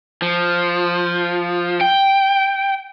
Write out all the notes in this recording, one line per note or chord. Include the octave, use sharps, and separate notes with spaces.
F3
G5